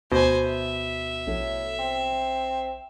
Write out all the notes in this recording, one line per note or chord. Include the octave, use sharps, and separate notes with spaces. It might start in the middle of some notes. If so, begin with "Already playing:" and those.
D2 B2 C5 G#5
E5
A#1 A2
C4